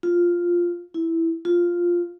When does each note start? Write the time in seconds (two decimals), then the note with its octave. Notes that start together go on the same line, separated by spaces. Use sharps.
0.03 F4
0.94 E4
1.45 F4